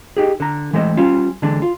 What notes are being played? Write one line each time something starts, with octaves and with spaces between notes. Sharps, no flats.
D#4 G4 G#4
D3 A#5
E3 G#3 A3 C4 D#5
G3 C#4 F4
D3 E3 G#3 D4
F4